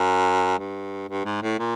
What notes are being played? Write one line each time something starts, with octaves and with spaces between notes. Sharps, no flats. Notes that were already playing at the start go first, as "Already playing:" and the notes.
Already playing: F#2
G2
G2
G#2
A2
A#2